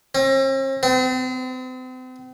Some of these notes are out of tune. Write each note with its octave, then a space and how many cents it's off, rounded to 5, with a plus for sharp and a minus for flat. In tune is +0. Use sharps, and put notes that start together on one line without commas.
C4 +45
C4 -40